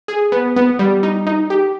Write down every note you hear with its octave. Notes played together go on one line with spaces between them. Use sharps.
G#4
B3
B3
G3
D#4
D#4
G4